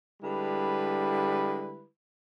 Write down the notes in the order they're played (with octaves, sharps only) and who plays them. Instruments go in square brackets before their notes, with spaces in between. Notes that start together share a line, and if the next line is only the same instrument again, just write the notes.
[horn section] D3 G3 G#3 E4 B4